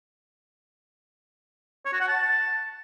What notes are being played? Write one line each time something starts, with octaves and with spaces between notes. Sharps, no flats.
C#5
F#4
F#5
A5